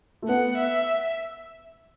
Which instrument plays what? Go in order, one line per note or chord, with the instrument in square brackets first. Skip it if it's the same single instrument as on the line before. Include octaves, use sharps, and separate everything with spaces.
[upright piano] A3
[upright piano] B3 [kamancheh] F#5
[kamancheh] E5